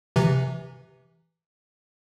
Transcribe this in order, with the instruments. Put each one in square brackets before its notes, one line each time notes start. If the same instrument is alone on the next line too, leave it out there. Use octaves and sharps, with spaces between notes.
[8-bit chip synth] C3 E3